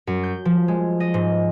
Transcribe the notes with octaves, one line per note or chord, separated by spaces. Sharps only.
F#2
G6
F3
G#3
D#5
G#2